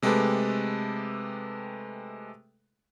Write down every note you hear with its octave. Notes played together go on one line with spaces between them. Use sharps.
C3 G#3 A3 G4 A4 B4